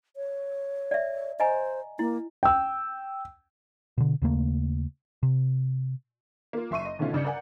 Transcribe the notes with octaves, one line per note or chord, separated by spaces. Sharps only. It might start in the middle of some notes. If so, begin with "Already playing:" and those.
C#5
D5 E5
C5 D#5 G#5 A#5
A#3 E4
G5 E6
B2 D3
D#2 C#3 A3 A#3
C3
A#3 F4
F#1 E5 C6 C#6 D#7
D#5
B2 D3 D#3 A3 C#4 F4
G2 C#3 D5 G6 C#7
A#4 D5 F#5 G#5